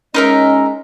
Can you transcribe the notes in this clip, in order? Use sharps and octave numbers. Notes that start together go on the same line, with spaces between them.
G#3 C#4 D#4 A#4 D#5 E5